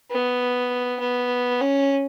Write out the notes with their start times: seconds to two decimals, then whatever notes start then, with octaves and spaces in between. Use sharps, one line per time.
0.11 B3
1.00 B3
1.61 C#4